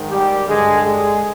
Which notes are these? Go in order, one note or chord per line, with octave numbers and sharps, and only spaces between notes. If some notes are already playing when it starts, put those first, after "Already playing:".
Already playing: G#2 D#3
G3 G4
G2 D3 G#3 G#4
G#3 G#4